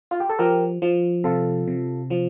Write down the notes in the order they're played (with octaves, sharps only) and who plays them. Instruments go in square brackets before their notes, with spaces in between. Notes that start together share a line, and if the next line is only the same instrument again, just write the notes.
[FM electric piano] F4
G4
A4
F3 G4 A#4
F3
C3 F4 A4
C3
F3